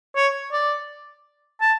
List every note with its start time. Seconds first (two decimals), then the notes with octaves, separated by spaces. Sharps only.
0.16 C#5
0.53 D5
1.61 A5